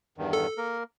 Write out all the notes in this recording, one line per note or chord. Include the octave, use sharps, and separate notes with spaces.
E2 G2 D#3
A4
A#3 A#4